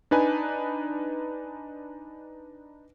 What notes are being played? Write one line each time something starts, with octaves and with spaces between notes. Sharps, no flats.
D4 D#4 B4 G#5